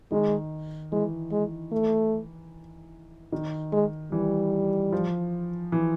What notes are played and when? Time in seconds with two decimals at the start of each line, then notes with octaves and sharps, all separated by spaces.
0.12 D#3 G#3
0.92 E3 G#3
1.31 G#3
1.72 A3
3.32 D#3
3.72 G#3
4.12 E3 G3
4.92 F3
5.72 E3